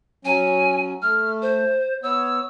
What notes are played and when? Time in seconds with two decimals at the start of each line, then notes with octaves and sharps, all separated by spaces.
0.25 F#3 C#4 G#5
1.02 A3 F6
1.42 C5
2.03 B3 C#5 E6